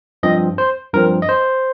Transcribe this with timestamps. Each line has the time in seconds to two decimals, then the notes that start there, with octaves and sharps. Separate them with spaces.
0.23 G2 F3 C4 D#5
0.58 C5
0.94 G2 F3 C4 A#4
1.22 D#5
1.29 C5